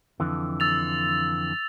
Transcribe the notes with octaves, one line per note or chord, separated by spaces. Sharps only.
F2 D3 E3
E6 A6 F7